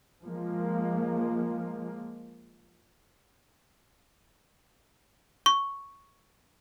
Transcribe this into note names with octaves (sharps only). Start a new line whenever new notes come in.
F3 G#3 A#3
C#6